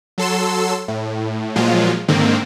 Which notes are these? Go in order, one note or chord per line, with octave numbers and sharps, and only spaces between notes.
F#3 A4 C6 E6
A2
A#2 F3 F#3 G#3 F4
G#2 D3 D#3 A#3 C4